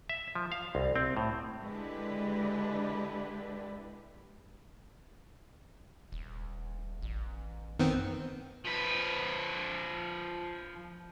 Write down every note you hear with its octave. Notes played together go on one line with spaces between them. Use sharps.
E5
F3
F5
C2
C4
A2
D3 G#3 D4 E4 G4 B4
D#1
A1
F#2 D#3 B3 C4
F3 B4